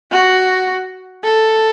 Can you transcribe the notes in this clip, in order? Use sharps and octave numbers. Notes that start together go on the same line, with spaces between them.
F#4
A4